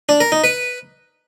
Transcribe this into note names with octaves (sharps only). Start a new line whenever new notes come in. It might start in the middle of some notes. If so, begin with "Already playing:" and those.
D4
A#4
D#4
B4